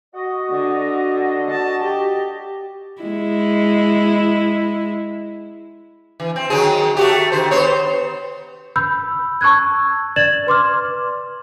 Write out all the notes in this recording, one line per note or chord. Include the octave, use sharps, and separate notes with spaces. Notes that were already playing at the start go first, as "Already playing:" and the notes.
F#4 D#5
D3
A5
G4
G#3 E4
E3
C4
D#3 F#3 G#4
A3 F#4 G4
D#3 C5
B3 C5 C#5
B5 E6 G6
A5 C#6 E6 F#6 G#6
D5 G#6 A6 E7 F#7
B4 C6 D6 F6